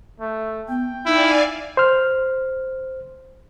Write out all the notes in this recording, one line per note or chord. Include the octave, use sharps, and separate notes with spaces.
A3
B3 G5
D#4 E4 D5 F5 G#5
C5 F6